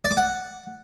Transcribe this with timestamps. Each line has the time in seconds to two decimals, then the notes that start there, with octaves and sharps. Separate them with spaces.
0.05 D5
0.11 D6
0.17 F#5